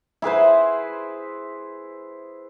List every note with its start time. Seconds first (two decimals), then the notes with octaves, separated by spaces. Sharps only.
0.22 E4 G#4 B4 C5